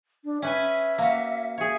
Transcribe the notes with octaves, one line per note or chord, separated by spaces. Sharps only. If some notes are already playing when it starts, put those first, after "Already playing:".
D4
C#4 B4 E5 G#5
A#3 F#4
G#4 C#5 E5